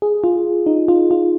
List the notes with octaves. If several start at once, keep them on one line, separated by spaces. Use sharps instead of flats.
G#4
F4
D#4
F4
F4